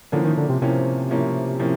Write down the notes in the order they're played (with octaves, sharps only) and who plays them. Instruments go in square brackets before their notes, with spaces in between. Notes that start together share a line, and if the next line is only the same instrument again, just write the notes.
[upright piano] A2 F3 A#3 C#4 [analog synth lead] D3
[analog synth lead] D#3
D3
C3
[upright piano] A2 F3 A#3 C#4 [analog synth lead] C3
[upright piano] A2 F3 A#3 C#4
A2 F3 A#3 C#4